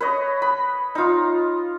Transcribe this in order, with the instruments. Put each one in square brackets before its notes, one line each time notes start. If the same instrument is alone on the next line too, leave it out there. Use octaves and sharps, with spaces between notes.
[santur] B4 C#5 D#5
B5
D#4 F4